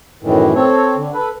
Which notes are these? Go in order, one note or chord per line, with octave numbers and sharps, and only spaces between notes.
F#2 A2 D#3 E3
C4 A4 C#5
D3
A4 B4